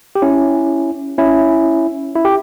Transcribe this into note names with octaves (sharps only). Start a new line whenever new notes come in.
G4
C#4 E4
C#4 E4
E4
G4